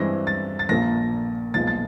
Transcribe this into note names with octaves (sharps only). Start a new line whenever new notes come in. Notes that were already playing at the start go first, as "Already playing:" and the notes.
Already playing: G2 E3 G#3 C4 A#6
A6
A6
A#1 A#2 F3 A#3 A#6
B1 A#2 F3 G#3 B3 A6
A6